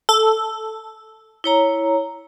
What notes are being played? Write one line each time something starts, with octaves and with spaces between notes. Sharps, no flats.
A4
E4 C#5 A#5